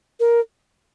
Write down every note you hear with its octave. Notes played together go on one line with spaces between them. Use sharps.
A#4